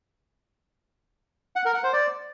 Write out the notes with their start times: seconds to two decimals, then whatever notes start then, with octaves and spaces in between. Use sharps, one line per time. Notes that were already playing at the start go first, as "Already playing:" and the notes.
1.56 F#5
1.65 A#4
1.74 F#5
1.84 C5
1.93 D5